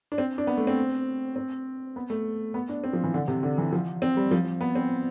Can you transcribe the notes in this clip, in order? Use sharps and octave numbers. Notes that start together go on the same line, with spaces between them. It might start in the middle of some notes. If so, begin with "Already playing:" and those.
D4
C4
D4
B3
A3
C4
C4
B3
A3
B3
D4
C4
F3
E3
D3
C3
D3
E3
F3
C4
G3
F3
B3
C4